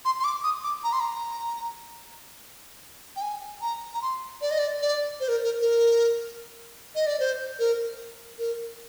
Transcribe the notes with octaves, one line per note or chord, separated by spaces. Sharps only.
C6
C6
D6
D#6
D6
A#5
C6
A#5
G5
G#5
A#5
A#5
C6
D5
D#5
D5
D5
C5
A#4
A#4
A#4
D#5
D5
C5
A#4
A#4